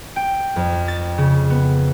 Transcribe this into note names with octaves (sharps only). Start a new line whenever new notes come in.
G5
F2
A6
C#3
B3